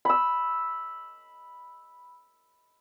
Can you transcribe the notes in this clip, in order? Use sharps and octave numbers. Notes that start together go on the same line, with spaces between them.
B5 E6